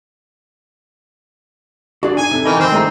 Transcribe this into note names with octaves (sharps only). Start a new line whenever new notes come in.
D4 F#4 G#4 D5
D#4 G#5 D#7
C3 A4
D#3 E3 A#4 D#5 B5 D#7
D#3 C4
A3 D4 E4 G#4 G#5 A#5